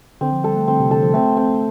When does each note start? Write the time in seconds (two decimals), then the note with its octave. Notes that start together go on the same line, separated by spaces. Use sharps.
0.21 D3 C4
0.33 F3
0.44 G3 A4
0.56 A3
0.68 D3 C4
0.80 C3
0.91 D3 A4
1.03 F3
1.14 A3 C4
1.37 C4